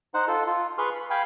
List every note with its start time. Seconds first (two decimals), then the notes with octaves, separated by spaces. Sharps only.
0.14 D#4 C5 F#5
0.28 F4 A4
0.46 F4
0.78 G#4 B4 C6 C#6 F6
0.95 B5
1.10 F5 G5 G#5 B5